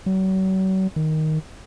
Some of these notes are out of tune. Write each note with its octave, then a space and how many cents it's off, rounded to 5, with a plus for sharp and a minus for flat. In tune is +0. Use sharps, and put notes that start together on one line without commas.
F#3 +40
D#3 +5